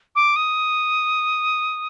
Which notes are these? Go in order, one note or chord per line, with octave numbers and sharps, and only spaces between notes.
D6
D#6